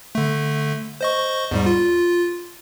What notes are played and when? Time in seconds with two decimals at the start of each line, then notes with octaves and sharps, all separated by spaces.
0.15 D3 A3
1.01 C5 D#5 C#6
1.51 E2 G#2 G3
1.66 F4